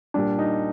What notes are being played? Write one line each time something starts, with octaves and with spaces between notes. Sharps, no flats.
A#2 G3 D4
D#4